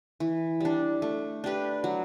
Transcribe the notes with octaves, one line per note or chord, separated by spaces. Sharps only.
E3
G3 D4
A3
D4 G4 B4
F#3